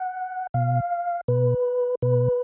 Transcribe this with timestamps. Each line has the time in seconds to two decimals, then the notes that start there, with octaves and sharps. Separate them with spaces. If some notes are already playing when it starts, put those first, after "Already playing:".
Already playing: F#5
0.54 B2 F5
1.28 B2 B4
2.02 B2 B4